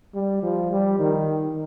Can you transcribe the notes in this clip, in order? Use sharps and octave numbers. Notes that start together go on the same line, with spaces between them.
G3
F3
G3
D#3